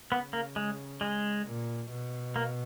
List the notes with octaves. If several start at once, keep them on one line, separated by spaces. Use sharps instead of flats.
C#3 B3
A#3
G#3
G#3
A#2
B2
A#3